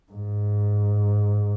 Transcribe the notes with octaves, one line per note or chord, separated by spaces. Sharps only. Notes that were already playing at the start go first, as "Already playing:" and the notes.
G#2